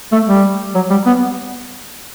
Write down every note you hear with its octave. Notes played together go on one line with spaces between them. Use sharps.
A3
G3
F#3
G3
B3